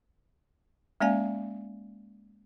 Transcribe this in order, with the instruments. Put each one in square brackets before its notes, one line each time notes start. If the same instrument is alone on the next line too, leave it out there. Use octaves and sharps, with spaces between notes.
[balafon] G#3 A#3 C#4 D5 F5 G#5